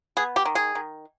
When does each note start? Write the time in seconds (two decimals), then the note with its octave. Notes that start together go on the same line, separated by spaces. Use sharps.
0.17 B3 G#4
0.36 G4
0.45 D#3
0.55 G#4
0.75 D#3